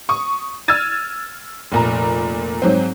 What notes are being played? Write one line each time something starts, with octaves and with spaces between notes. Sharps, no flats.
C#6 D#6
E6 F6 G#6 A6 D#7
F1 A#2 A#5
G#2 F#3 C4